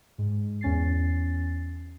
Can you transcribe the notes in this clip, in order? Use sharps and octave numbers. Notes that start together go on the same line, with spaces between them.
G#2
E2 C#4 A6 C7